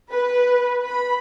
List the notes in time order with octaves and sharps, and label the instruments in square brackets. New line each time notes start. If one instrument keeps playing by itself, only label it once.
[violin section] B4
B5